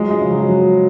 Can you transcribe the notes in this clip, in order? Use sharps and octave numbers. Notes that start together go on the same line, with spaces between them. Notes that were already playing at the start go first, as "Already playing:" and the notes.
Already playing: F3 F#3 G#3
G#3
C#3
F#3
F#3